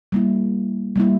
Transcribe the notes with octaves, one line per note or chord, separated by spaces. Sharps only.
G3 A#3 E4
G3 A#3 E4